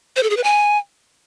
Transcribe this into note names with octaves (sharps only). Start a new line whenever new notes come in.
C5
A4
G#4
B4
G#5